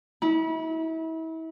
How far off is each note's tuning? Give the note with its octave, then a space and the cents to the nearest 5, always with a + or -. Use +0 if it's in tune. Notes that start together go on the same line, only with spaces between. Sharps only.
E4 -35